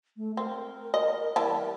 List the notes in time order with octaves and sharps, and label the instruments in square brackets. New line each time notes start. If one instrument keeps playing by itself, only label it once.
[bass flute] A3
[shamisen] C4 [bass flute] A#4
[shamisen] D#5
E3 G3 A5